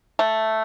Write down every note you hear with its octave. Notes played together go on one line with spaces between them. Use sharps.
A3